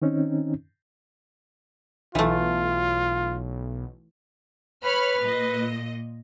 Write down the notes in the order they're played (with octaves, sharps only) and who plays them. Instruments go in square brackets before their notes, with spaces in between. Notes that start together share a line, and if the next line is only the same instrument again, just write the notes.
[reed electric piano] D#3 C4 C#4 D#4
[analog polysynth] B1 [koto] E3 A3 [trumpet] F4
[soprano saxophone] B4 [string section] C#5 B5 F6
[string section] A#2 D#5